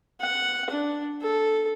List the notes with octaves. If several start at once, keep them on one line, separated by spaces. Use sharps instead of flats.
F#5
D4
A4